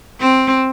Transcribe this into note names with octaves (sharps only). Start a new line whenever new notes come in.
C4